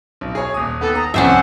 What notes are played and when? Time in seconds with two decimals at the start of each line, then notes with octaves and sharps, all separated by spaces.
0.21 B1
0.35 G#4 C#5
0.54 D#1 D#6
0.81 D#2 B3 A4
0.95 A#5 D#6
1.14 C2 F2 C#4 C5 E5 F#5